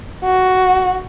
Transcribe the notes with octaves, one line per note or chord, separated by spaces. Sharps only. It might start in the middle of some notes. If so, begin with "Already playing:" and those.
F#4